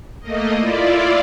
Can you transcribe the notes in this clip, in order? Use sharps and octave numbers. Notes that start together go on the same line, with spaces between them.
A3 A#3 D#5
E4 F4 D5